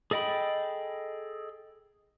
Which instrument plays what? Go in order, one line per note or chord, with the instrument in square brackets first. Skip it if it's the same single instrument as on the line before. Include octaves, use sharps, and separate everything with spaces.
[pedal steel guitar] G#4 A4 D#5 G5 B5